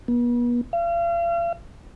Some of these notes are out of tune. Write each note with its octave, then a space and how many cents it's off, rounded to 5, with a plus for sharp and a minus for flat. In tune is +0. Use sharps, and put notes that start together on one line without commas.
B3 -40
F5 -40